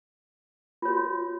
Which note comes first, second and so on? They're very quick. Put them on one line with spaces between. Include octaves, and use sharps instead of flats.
F4 C#5 F#4